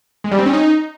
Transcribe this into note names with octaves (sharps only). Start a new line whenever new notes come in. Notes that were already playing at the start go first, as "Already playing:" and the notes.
G#3
G3
C4
C#4
D#4